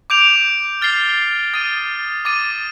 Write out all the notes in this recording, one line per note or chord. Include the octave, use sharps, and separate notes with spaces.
D6 G6 D7 F7
F6 A6 C7 G7
D#6 A6 D#7
D6 A6 D#7